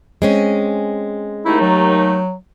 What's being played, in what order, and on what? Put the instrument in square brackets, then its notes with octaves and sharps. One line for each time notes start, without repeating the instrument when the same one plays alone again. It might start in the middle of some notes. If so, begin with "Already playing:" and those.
[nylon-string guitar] G#3 C4 C#4
[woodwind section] D#2 A3 D#4 [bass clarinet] E4
[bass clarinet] F#3